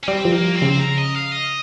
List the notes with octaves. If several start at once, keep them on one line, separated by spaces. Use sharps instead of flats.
C#4
G3 C4
F3
A#3
C4
C#3
C5
A#4
D#5
F5
D#5